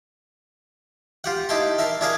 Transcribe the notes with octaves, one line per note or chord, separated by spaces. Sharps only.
F4 G4 F#5
D#4 E4 G4 G5 A5 C6
A#4 E5 A5 C6
D4 E4 G#4 A#4 F5 D6